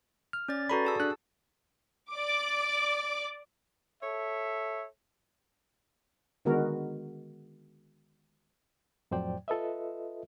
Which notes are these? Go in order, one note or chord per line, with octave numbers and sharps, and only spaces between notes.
F6
C#4 D5 A6
F#4 A4 B4 D5 A#5 B5
G#4 A5 E6
D4 F#6
D5 D6
A4 C#5 E5
D3 D#3 G#3 B3 F#4 A#4
F2 A2 F#3 C5 D5 G5
F4 A4 B4 D#5 E5